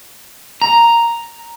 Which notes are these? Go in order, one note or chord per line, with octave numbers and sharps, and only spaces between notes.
A#5